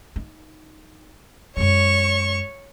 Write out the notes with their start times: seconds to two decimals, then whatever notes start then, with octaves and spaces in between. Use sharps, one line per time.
0.16 D#4
1.57 F#2 G#3 C#5 C#6